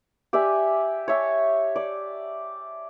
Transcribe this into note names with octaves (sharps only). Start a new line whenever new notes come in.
G4 D5 E5 G#5
C#5 E5 A5
D5